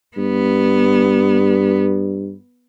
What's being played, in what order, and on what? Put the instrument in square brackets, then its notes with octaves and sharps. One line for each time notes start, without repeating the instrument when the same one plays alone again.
[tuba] G2 [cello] B3